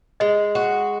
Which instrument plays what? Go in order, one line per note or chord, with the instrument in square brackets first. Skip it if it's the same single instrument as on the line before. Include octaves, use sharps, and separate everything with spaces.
[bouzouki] G#3 [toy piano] D#5
[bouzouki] F#4